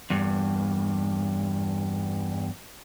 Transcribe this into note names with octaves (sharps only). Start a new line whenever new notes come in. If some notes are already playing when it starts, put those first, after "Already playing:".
E2 G2